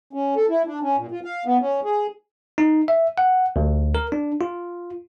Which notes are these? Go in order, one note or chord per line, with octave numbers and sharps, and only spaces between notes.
C#4
A4
E4
D4
C#4
A#2
F4
F5
B3
C#4
G#4
D#4
E5
F#5
D2
A#4
D4
F4